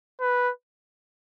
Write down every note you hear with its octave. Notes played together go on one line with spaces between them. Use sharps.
B4